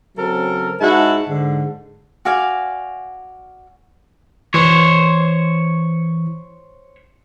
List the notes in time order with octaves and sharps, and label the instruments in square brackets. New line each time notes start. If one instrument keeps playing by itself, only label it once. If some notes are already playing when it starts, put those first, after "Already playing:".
[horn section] C#3 F#3 C4 A4 A#4
G#2 G#3 D#4 E4 F#4 A5
G#2 D3
[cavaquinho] F#4 D5 F5 G#5
[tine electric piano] E3 [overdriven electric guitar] C5 C#5